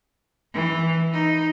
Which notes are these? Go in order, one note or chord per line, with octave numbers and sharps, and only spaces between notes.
E3
D#4